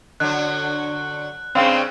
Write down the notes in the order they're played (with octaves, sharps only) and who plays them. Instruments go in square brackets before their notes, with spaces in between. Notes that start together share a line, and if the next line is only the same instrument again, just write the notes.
[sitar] D3 F#3 [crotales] F#6
[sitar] G2 C#3 [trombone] C4 [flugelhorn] F5